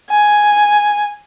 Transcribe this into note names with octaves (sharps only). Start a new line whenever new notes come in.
G#5